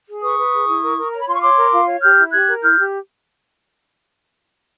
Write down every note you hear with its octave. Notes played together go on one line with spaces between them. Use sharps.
G#4
B4 C#6 D#6
B4
G#4
E4
A#4
A#4
C#5 A#5
B5
F4 C6
C#6
C#5 C6 D6
A#4
F4
C#5
G4 F6 G6
E4
G4 F#6 G#6
A#4
E4 F6 G6
G4